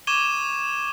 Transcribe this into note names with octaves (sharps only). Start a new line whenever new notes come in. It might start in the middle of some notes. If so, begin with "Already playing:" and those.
C#6 D6 G#6 D#7 E7 G7